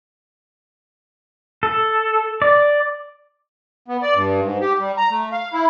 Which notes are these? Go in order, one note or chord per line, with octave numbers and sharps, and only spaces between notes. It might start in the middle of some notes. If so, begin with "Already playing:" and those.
A4
D5
B3
D5
G2
G#2
G4
G3
A#5
A3
F5
E4